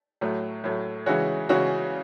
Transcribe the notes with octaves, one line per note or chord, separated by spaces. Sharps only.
A2 F#3 A3
A2 F#3 A3
C#3 E3 G#3 C#4 F#4
C#3 E3 G#3 C#4 F#4